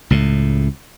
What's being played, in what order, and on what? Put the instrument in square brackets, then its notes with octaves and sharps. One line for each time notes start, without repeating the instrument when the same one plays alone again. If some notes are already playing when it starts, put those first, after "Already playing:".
[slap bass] C#2 A2